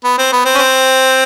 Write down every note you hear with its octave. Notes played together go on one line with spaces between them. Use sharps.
B3
C4
B3
C4
C#4
C4